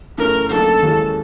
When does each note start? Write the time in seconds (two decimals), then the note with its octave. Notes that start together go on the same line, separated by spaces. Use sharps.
0.17 F#2 C#3 E3 A3 C#4 A#4
0.50 D2 C#3 F#3 A#3 D#4 A4
0.82 D#2 C#3 E3 G#3 C#4